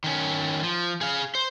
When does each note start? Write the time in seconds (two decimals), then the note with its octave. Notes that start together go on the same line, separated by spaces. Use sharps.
0.04 D#3 C#4
0.63 F3
1.01 G#4 F5
1.35 C5